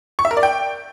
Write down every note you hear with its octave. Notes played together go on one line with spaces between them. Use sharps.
C#6
E5
A#4
D5
G5